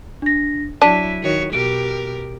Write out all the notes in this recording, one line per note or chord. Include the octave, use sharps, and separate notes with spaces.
D4 A#6
F#3 D4 E4 B6 D#7
D#3 F#4 C#5
B2 G4 A#4 D7